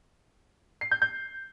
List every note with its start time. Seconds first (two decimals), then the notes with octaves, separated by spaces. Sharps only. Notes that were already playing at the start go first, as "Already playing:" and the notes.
0.81 C7
0.91 G6
1.02 G6